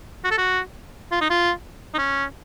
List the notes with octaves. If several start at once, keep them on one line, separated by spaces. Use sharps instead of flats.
F#4
A4
F#4
F4
D#4
F4
D#4
C#4